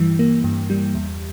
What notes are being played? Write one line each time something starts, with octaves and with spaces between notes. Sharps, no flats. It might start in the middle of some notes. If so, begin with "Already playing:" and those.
Already playing: G2 E3 G3
A#3
G2
G3
E2